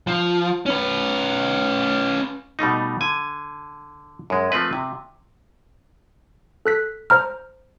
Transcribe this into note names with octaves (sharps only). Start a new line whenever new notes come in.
F3
C#4 B4
B2 G3 A3 D#4
D3 G#5
F#2 G#3
F3 A3 C4 B4
C3
A4 F#6 B6
C5 A#5 F6